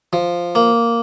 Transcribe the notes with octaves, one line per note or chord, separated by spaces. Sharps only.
F3
A#3